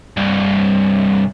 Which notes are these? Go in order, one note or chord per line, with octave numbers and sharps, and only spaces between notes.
C2 G2